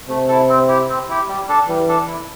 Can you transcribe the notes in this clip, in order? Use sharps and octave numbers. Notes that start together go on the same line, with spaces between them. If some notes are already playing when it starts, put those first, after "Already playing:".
C3 A3
E4 A4
C4
E4 G4
C4
E4 G4
G3
D4 A4
E3 G3
D4 A4
E4